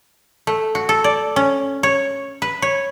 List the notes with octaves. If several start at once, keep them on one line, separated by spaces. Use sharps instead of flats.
A3
F#4
A4
D5
C#4
C#5
B4
C#5